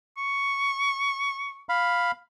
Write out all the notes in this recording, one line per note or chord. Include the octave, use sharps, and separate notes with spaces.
C#6
F5 B5